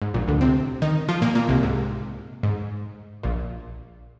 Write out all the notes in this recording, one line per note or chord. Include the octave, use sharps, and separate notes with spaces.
G#2
A#1 A#2
D2 D3
C3 C4
D#3 D#4
F3 F4
A#2 A#3
A#2 A#3
C2 C3
G#2
G#2
A#1 A#2